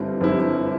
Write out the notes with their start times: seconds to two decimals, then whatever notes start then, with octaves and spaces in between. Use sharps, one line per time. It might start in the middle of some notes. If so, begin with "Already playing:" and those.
Already playing: G1 G2 G3 C4 E4
0.21 G1 G2 G3 C4 E4